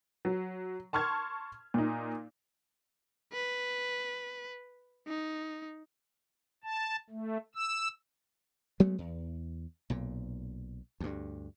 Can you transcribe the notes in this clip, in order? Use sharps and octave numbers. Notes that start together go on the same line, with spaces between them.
F#3
A5 C6 C#6 F6 G#6
A#2 D#4
B4
D#4
A5
A3
E6
F#3 G#3 A3 B3
E2
B1 A#2
D2 G2